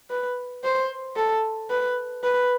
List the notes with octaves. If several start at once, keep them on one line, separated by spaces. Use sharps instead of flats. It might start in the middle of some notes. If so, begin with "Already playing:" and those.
B4
C5
A4
B4
B4